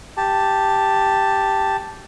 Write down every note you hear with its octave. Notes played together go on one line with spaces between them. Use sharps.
G4 A5